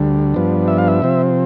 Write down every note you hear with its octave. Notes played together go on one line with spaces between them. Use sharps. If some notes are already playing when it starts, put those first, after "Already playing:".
Already playing: D2 D3 G3
G2 F3 B3 D4
E5
F5
E5
C3 F3 C4